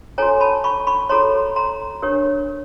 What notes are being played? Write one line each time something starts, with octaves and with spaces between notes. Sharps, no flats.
F#4 A4 C#5 G#5 A#5
A5 B5
B5 C#6
B5 C#6
F#4 A4 C#5 A#5 C6
A#5 C6
D4 G4 A#4 C#5